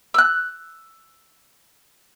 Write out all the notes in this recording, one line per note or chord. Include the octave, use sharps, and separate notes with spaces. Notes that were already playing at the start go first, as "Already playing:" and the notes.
E6 F#6